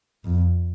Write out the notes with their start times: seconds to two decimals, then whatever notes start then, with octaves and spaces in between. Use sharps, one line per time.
0.25 F2